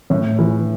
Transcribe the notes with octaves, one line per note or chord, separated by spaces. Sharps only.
A2
E3